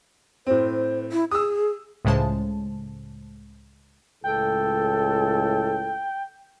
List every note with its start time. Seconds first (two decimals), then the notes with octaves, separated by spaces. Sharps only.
0.47 A2 C4 C5
1.12 E4
1.31 G#4 D#6 E6
2.05 C#2 A2 C#3 G#3 C5 A5
4.24 C#2 A2 A4 G5